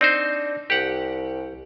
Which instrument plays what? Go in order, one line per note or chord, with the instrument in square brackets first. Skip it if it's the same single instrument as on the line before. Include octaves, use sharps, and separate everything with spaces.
[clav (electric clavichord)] C4 D#4 C5 [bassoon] D4
[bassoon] C2 [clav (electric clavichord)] G4 F#5